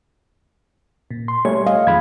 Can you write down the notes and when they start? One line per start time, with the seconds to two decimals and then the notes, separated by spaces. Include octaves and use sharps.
1.11 A#2
1.28 C6
1.45 G3 A3 C#5 G#5
1.67 D#5 F5
1.87 F2 D#3 G#3 B5 G#6